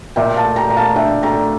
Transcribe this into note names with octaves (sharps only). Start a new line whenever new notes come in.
A#2 E5 G5
F5 A5
A3
G5 A#5
A#2 A#5
F5 A5
D4 E5 G5
A3 G5 A#5